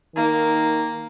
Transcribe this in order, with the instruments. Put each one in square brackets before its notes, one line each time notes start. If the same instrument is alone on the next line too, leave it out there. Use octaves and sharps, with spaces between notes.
[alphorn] D#3 [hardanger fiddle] A#3